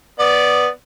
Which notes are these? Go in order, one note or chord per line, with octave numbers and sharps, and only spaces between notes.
B3 D5